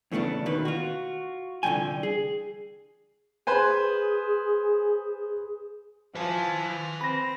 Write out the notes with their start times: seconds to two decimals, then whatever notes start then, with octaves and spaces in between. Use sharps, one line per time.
0.11 E2 C#3 A3 B3 D4
0.46 D#2 B2 D#3 B4
0.65 F4 F#4
1.63 C2 D3 E3 F3 G5 G#5
2.03 G#4
3.47 G#4 B4 C5 G#5
6.15 F3 B4 G#5
7.01 C4 B5 A#6